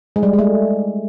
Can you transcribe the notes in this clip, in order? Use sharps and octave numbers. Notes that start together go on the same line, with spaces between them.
G#3
G3
G#3
A3